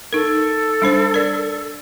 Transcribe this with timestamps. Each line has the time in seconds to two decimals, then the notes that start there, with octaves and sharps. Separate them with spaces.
0.13 D#4 A4 A#4
0.82 G3 D4 C5
1.14 A#4 D5